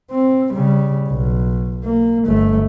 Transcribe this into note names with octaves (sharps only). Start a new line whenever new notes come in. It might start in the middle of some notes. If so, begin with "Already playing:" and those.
C4
C#3 G3
B1
A#3
G1 A3